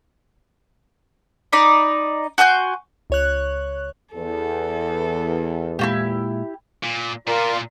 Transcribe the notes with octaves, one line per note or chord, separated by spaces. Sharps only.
D#4 D5 B5
F#4 G#5 C6 G6
C#2 C#5 F#6
E2 A4
A#2 G#3 E4 F#4 G4 F5
A#2
A#2 F4 A#4 D5